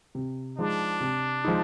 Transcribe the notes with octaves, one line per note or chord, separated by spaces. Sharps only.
C3
F3 G#3 D4 D#4
C3
F3 G#3 D#4